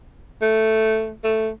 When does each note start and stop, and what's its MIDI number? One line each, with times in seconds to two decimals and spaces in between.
0.42 1.12 57
1.24 1.49 57